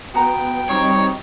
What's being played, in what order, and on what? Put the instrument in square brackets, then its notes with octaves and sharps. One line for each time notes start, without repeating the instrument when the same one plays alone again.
[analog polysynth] B3 [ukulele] F#4 A#5 [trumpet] G5
[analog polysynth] G3 C4 D#4 [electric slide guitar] C#5